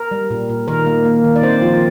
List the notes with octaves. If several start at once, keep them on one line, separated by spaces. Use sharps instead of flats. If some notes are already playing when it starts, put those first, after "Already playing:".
Already playing: A#4
G3
A#2
A#2
D#3 A#4
A#3
A#3
D#3
D5
C4 C5
F3 F4